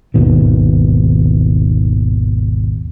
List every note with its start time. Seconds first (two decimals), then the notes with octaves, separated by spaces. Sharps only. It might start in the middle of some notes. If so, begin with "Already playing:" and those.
0.14 G#1 D#2 B2 D#3